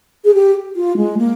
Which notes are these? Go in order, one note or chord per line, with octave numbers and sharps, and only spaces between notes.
G#4
G4
F4
G#3
A#3